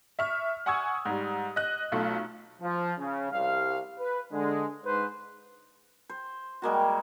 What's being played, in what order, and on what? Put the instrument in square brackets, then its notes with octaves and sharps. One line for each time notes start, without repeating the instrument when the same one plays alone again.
[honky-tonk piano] E5 C#6 F6
F#5 G#5 C#6 D#6 E6 G#6
G#2 G3
D#5 F#6
B1 A3 F4
[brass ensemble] F3
C#3
C2 C3 G3 F5
B4
D3 G#3
G#2 B4 C5
[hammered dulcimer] C5
G3 G#3 A#3 F#4